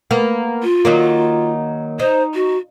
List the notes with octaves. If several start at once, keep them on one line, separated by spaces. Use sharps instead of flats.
A#3 B3
F4
D#3 F#3 A#3
D#4 C5
F#4